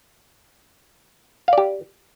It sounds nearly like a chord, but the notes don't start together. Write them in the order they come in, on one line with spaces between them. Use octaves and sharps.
F5 D5 G4